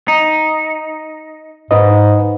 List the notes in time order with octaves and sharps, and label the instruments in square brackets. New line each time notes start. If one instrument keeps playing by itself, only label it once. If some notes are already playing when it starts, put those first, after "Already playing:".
[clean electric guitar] D#4
[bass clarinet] G#2 [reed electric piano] D#4 B4 D#5